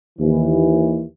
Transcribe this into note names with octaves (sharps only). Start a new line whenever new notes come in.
D#2 E3